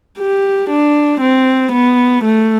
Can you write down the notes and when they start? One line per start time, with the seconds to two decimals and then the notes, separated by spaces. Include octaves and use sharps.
0.19 G4
0.70 D4
1.21 C4
1.72 B3
2.25 A3